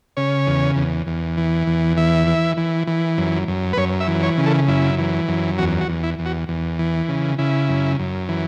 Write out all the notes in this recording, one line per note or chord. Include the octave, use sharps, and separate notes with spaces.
C#3 C#5
E2
E2
E2
E3
E2
E3 E5
E3
E3
E3
F#2
F#2
B4
F#2 C#5
E5
E3
C#5
C#3
A4
F#2 E4
E3
F#2
E2 F#4
F#4
E2
E4
E2
F#4
E2
E3
C#3
C#3 E4
F#2
F#2
E3